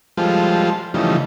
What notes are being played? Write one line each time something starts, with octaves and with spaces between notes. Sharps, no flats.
F3 G3 G#3 F4 A4 C5
C#3 E3 F3 G3 A3 D#4